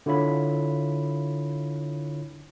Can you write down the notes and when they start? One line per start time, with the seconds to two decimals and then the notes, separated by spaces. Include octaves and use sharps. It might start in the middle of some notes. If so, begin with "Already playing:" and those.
0.06 D3 E4 F4 C#5 B5